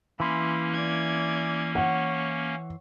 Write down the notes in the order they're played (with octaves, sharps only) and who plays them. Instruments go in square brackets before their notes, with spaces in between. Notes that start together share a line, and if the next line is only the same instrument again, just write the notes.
[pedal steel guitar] E3 C6 [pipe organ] A#3 C#4 [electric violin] B5
[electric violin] D5 G#6
[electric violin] C#5 [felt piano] F#5